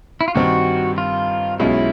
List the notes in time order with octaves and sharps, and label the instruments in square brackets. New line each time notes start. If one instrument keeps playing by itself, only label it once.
[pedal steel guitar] E4
F4
[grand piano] G2 D#3 G3 C4 [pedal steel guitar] F#4
[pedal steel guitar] F4
[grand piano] B1 B2 G#3 C#4 F4 [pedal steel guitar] E4